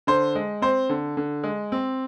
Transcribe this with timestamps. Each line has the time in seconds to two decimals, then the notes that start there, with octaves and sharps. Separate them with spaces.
0.07 D3 C5
0.35 G#3
0.62 C4 C5
0.89 D3
1.17 D3
1.43 G#3
1.72 C4